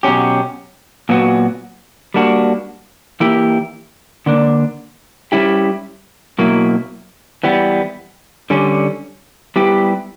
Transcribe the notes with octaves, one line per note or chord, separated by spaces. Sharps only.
B2 F#3 C#4 G4
A#2 F#3 B3 F#4
G3 A#3 D4 F#4
E3 A#3 E4 G4
D3 A#3 D4
G3 C#4 E4 G4
B2 F#3 A#3 E4
E3 G3 B3
D3 G3 C#4
G3 B3 E4 G4